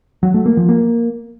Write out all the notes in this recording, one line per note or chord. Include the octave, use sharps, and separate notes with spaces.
F#3
A3
A#3
F3
A#3